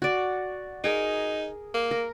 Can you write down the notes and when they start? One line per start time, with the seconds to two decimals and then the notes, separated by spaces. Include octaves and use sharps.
0.02 F#4 D5
0.84 D#4 G#4 A#4
1.74 A#3
1.91 A#4